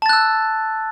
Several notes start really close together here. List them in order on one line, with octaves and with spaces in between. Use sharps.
A5 A6 F#6 E6